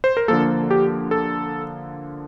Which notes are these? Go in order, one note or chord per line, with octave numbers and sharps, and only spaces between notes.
C5
A#4
D3 F3 A#3 A4
G4
A4